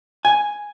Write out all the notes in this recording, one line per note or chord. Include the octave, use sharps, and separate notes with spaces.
G#5